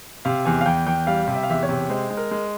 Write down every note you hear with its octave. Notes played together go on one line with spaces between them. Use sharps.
C3 F5
E2 G#5
F5
E2 G5
E2 G5
G3 F5
C3
E5
F5
E2 E5
C#5
C3
G#3 C5
G#3
A#4
G#3